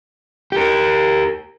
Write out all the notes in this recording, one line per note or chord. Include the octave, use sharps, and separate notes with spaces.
G4 A#4